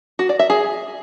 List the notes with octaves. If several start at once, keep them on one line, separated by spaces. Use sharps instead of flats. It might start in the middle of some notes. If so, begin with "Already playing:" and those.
F#4
D5
E5
G#4